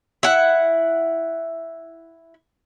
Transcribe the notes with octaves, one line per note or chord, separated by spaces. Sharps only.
E4 F#5